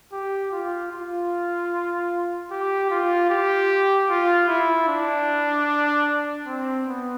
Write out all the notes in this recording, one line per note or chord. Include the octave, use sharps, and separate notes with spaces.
G4
F4
F4
G4
F4
G4
F4
E4
D4
C4
B3